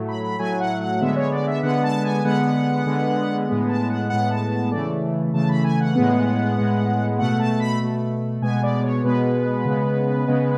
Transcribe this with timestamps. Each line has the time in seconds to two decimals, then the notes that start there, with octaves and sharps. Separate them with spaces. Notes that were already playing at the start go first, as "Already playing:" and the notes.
Already playing: A2 F#3 A3
0.08 B5
0.24 B5
0.39 A2 F#3 A3 G#5
0.60 F#5
0.81 F#5
1.01 D3 G#3 B3 E5
1.16 C#5
1.32 D5
1.47 E5
1.63 D3 G#3 B3 F#5
1.84 A5
2.04 G#5
2.25 D3 G#3 B3 F#5
2.86 D3 G#3 B3
3.48 A2 G#3 B3
3.69 A5
3.90 F#5
4.10 A2 G#3 B3 F#5
4.30 A5
4.51 A5
4.71 C#3 E3 A3 D5
5.33 C#3 E3 A3 A5
5.49 B5
5.64 G#5
5.80 F#5
5.95 A2 G#3 B3
6.57 A2 G#3 B3
7.19 B2 A3 F#5
7.39 A5
7.60 B5
7.80 B2 A3
8.42 B2 G#3 B3 G#5
8.63 D5
8.83 C#5
9.04 B2 G#3 B3 B4
9.65 C#3 G#3 B3
10.28 C#3 G#3 B3